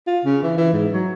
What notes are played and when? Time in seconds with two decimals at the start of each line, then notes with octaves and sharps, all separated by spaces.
0.07 F4
0.25 C#3
0.42 E3
0.57 E3
0.73 G#2
0.92 F#3